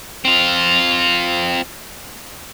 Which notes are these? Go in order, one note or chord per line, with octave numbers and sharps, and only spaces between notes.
C4 F4